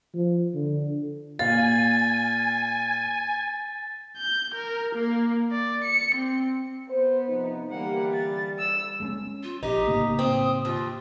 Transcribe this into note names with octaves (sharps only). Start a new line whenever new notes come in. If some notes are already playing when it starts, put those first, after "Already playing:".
F3
D3
A#2 F5 G#5 A6
G6
A#4
A#3
D5
C#7
C4
B3 C5
C3 F3 D#4
D3 E3 G3 A#3 F#5
A6
E6
G#3 A3 C#4
F4
A#1 D#4 G4
A2 C#3 A#3
C4 D#6
D#2 F4